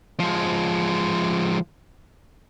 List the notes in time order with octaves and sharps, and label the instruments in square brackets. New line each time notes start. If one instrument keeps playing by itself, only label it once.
[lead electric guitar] F3 G#3